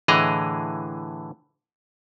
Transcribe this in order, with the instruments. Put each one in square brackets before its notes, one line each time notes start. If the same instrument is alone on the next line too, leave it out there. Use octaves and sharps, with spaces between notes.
[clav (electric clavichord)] A2 D3 E3 G#4 D#5 A#5